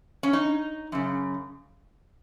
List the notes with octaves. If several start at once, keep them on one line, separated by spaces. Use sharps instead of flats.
C#4
D#4
F#2 C#3